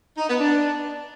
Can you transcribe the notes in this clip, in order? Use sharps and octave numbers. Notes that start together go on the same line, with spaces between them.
D#4
B3
D4